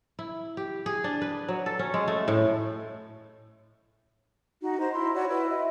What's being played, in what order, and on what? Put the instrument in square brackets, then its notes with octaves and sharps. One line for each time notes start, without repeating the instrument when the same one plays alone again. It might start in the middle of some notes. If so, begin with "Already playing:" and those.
[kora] E4
G4
G#4
D4
B4
F#3
A4
C#4
G#3
A3
A2
[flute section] D#4 F#4
C5 D#5 A#5
E4 C6
F#4 C#5 D5
E4 B4
D#5 E5